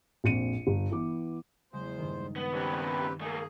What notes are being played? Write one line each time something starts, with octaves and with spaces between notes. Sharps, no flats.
A#1 F2 C#7 D#7
G1
E3 B3 D6
E2 C#3 F#3 G#3 C5
G2 D#3
B3
C#3 B3 C4 G4 B4
A3 A#3 G#4 D#6